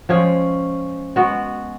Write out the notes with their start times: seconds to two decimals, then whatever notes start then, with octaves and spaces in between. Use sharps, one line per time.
0.09 F3 G#3 C#4 G#4
1.16 G#3 B3 F#4